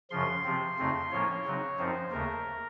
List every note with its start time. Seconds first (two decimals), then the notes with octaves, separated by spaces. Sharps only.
0.11 F#2 C#3 F3 C6
0.44 C3 F3 C4
0.78 F2 C#3 A3 C4 D#4
1.11 A2 F3 A#3 C#4 C#5
1.45 C#3 F#3 C4 D#4
1.78 F#2 F3 C4 D#4 C5
2.11 D#2 C#3 A3 A#4